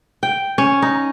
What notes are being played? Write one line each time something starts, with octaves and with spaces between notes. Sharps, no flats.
G5
C#4
D#4